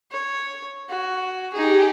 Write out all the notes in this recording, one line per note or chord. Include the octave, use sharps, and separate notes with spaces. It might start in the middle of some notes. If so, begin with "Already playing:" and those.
C#5
F#4
D#4 G4 G#4